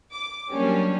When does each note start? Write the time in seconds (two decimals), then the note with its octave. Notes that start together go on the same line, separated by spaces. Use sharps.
0.12 D6
0.51 F#3 G3 A#3 C#4 D4